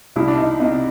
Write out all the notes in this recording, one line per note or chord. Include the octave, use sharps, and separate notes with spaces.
C2 E4
D4
D#4
C3 D#4